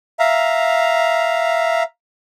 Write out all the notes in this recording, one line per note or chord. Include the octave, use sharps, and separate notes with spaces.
E5 F5 A#5